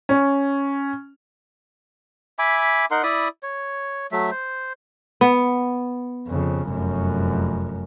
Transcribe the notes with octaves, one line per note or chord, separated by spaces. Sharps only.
C#4
E5 G#5 B5 D6
D#4 A#4 F#5 C6
E4 D5 B5 D#6
C#5
F#3 A3 E5
C5
B3
F2 C#3
F1 F#2